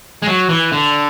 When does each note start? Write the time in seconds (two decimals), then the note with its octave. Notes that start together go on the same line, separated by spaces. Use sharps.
0.22 G#3
0.27 F#3
0.49 E3
0.72 D3